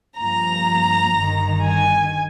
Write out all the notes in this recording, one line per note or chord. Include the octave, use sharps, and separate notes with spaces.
G2 F3 A#3 A#5
G1 G2 D#3
G#5